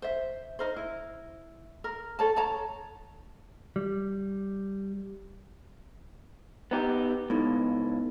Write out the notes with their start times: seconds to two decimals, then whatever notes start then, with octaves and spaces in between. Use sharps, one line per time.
0.02 C5 E5
0.59 D#4 A#4 C5
0.76 E4
1.84 A#4
2.19 A4 C#5 A5
2.36 C#5 A5 A#5
3.76 G3
6.71 B3 D#4 G4
7.30 C#2 A2 B3 D#4